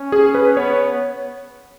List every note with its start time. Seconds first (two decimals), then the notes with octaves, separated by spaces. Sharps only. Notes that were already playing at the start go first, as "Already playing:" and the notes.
Already playing: C#4
0.12 G#4
0.35 B4
0.57 B3 C#5